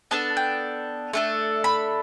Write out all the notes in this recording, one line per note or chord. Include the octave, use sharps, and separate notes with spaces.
B3 D4 A4 A5
G5
A3 D4 A4
B5